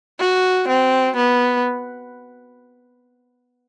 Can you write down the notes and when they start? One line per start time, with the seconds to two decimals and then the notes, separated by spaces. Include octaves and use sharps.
0.19 F#4
0.68 C4
1.17 B3